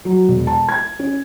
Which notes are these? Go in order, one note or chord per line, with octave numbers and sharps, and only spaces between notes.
F#3
E1
A5
G#6
C#4